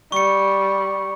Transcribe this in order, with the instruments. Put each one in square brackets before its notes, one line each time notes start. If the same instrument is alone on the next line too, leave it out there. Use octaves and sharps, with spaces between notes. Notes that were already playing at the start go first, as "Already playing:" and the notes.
[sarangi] G3 [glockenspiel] C#6 C#7